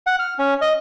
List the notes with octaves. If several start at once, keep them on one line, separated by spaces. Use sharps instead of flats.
F#5
F6
C#4
D#5